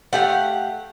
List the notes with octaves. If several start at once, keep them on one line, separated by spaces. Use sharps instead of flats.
A3 G4 F5 F#5